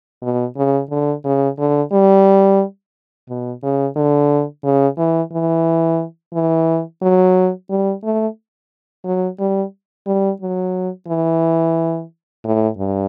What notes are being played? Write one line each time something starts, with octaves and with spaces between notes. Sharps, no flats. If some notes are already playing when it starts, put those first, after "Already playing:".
B2
C#3
D3
C#3
D3
G3
B2
C#3
D3
C#3
E3
E3
E3
F#3
G3
A3
F#3
G3
G3
F#3
E3
A2
G2